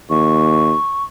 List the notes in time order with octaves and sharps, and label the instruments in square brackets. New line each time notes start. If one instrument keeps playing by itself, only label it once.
[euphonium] D#2 [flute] C#6